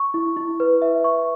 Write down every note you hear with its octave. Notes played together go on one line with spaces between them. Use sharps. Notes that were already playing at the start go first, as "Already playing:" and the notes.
Already playing: C#6
E4
E4
B4
E5
C#6